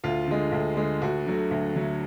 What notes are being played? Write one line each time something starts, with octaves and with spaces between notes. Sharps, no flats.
D2 F4
D3 G#3
D2
D3 G#3
D2 F#4
D3 F#3 A3
D2
D3 F#3 A3